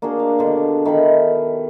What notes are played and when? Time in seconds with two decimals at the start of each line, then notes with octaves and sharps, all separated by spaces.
0.02 A#3 D4 F#4 G#4
0.19 F5
0.39 B2 D3
0.85 D#3 E4 A5 B5